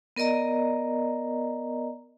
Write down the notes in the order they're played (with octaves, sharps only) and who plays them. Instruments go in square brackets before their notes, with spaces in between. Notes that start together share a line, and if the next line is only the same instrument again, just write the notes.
[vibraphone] B3 A#4 D5 D#5 A#5